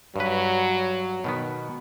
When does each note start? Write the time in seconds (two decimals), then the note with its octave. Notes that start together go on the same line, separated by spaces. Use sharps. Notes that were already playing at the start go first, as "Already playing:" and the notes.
0.16 G2 F#3 B4
1.24 B2 D#3 B3